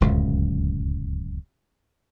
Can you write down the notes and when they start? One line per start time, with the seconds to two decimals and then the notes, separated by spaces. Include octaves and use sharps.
0.01 D1 C#2 F#2 C#3